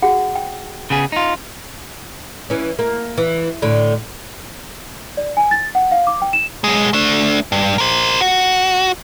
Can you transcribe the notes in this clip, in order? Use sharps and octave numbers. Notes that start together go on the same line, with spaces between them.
F#4 G#4 F#5
G5
C#3 B3 G#4
D#4 F4
E3 C#4
A#3
E3
A2 D3
D5
G#5
A6
F#5
F5
D6
G5
E7
B1 G#3
A3 D4
G2
A#4 C5
F#4